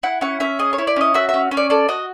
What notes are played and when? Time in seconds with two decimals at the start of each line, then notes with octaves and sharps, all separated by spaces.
0.03 E4 F#5
0.21 C#4 F#5
0.40 C#4 E5
0.59 G#4 D#5
0.73 C#5
0.78 E4
0.87 D5
0.96 C#4 D#5
1.14 F#4 E5
1.29 E5
1.34 C#4
1.51 C#4
1.57 D5
1.70 A4 D5
1.88 F#4 D#5